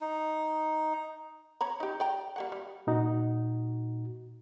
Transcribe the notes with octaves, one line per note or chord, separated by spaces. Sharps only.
D#4
C#5 A#5 B5
D#4 G4
D5 G5 A#5
G3 A#3 F#5
G3
A#2 D#4 F#4